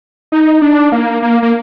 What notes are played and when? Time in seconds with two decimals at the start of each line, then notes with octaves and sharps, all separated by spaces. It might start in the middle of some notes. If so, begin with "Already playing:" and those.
0.32 D#4
0.62 D4
0.92 A#3
1.22 A#3
1.42 A#3